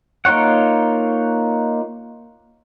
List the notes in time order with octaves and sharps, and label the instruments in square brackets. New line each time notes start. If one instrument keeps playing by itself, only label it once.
[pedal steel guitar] A#3 D#4 F4 C#5 F#5